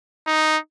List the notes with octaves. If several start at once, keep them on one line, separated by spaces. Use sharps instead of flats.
D#4